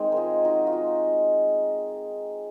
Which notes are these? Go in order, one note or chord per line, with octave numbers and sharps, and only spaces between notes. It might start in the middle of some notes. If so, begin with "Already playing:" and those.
Already playing: D#3 G#3 C4 D#4
F4 G#4 A#4
D#4 F#4
F4
D#4 F#4